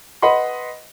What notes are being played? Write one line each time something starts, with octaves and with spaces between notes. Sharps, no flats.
B4 D#5 F#5 B5 C6